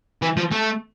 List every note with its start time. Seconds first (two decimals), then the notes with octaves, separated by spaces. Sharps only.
0.22 E3
0.37 F3
0.52 A3